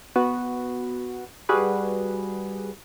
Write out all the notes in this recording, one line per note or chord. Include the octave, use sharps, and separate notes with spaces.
B3 F#4 B4
G3 F#4 G#4 B4